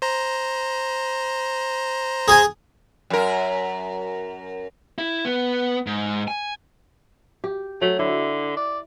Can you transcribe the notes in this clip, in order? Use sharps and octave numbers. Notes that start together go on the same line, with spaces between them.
C5 A#5
G#4 G#5
F#2 A#4
E4
B3
G#2
G#5
G4
F#3 A3
D3 E4
D5